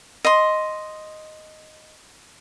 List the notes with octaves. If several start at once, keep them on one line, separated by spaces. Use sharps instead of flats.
D#5 C6